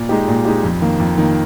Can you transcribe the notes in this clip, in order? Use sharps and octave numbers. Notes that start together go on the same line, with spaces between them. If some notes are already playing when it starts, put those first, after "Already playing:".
Already playing: A#2
G#3 D#4 G4
A#2
G#3 D#4 G4
F2
D#3 A#3
F2
D#3 A#3